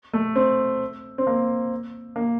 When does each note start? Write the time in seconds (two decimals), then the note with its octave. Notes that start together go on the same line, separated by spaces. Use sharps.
0.13 A3
0.36 C4
1.18 C4
1.27 A#3
2.16 A#3